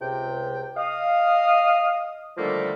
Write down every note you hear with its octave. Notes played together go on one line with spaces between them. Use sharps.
C#2 C3 G5
D#5 F5 D#6
D3 D#3 F3 G3 A3 A#3